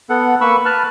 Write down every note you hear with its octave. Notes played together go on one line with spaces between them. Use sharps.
B3 A4 F#5
A#3 B4 B5 C#6 E6
B4 A5 F6 F#6